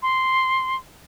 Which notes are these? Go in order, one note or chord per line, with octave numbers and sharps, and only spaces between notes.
C6